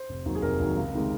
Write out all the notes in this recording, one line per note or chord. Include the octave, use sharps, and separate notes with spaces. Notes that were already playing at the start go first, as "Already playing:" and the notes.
Already playing: C5
F1
D#2 D#3 F#3
G#4
F1 A#4
D#2 D#3 F#3
C#2
C3 D#3 G#3